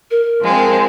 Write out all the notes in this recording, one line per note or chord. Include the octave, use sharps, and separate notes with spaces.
A#4
F3 G#3 C4